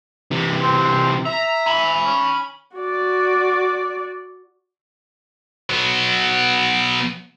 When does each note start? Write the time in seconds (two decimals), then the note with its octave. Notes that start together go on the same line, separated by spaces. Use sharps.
0.31 C3 E3
0.62 C4
1.26 E5 A#5
1.67 G#5 B5
2.05 C#4
2.76 F#4 D5
5.70 F#3 B3